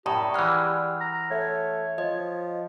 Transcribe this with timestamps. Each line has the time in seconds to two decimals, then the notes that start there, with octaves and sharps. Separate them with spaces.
0.06 F#2 A2 G3 G4 A#5 C#6 D#6
0.34 E3 G#3 F#5 F6
1.01 A#5
1.31 A3 C#5
1.98 F3 D#5